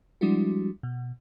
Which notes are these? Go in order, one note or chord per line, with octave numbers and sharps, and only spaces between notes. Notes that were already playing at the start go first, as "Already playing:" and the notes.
F3 G3 G#3 D4 E4 F#4
B2